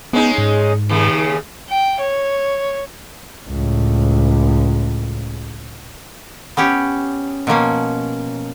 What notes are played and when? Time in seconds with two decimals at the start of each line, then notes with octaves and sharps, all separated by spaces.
0.13 G#3 B3 C#4 D#4
0.38 G#2
0.89 D#2 C#3
1.69 G5
2.01 C#5
3.49 C#2 A2
6.57 B3 C#4 G4 C#5
7.47 B2 F3 A#3 C#4